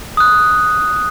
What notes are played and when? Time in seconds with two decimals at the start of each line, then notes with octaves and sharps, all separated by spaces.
0.17 D#6 F#6